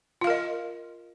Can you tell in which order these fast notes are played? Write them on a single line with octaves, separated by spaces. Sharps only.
F4 F5 A#4 D#5